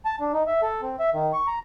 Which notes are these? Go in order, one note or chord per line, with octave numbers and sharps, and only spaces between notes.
A5
D4
D#4
E5
A4
C4
E5
D#3
C#6
A#5